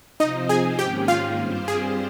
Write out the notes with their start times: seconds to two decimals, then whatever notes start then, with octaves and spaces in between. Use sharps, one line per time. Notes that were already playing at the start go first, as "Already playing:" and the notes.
0.20 C3 F3 C4 D#4 F4 C5 D#5
0.49 G#4 G#5
0.78 G#2 D#3 A#3 C#4 G4 G#4 G5
1.08 F4 F5
1.38 G2 G3 C4 G4 C5
1.68 G#4